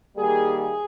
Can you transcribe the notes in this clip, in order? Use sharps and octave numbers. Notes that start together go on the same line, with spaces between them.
D#3 G3 A#3 G#4
G#4